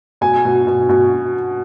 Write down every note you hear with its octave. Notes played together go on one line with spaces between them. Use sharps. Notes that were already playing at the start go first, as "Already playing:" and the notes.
B2 G#5
B2
B2
B2